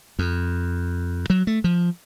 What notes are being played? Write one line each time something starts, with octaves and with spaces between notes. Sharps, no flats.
F2
F#3
A3
F3